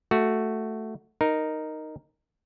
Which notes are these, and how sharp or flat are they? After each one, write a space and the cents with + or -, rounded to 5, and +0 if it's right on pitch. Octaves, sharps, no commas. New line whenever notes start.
A3 +0 F#4 +0
D#4 -5 A#4 +0